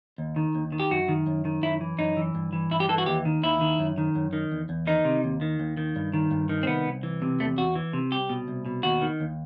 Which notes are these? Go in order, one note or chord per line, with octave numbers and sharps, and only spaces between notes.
D#2
D#3
D#2
D#3
G4
F#2 F#4
D#3
F#2
D#3
F#2 E4
E3
F#2 D#4
E3
G2
E3
G2 E4
G4
E3 A4
F#4
D#2 G4
D#3
D#2 E4
D#3
F#2
D#3
F#2
D#3
E2
E2
D#3 D#4
C3
D#2
D#3
D#2
D#3
G2
D#3
G2
D#3
C4
C2 B3
C2
E3
C3
E2 A3
E2 F#4
E3
C3
C2 G4
B2
C2
B2
D#2 F#4
D#3
D#2